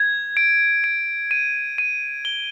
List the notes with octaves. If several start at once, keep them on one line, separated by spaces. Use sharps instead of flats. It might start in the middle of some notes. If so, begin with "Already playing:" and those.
Already playing: G#6
D7
D7
D#7
D#7
G7